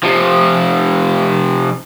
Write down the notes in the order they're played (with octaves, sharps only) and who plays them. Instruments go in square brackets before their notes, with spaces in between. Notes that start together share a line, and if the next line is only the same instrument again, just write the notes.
[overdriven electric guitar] C3 F3